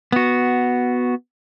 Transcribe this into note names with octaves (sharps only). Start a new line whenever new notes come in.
B3 F#4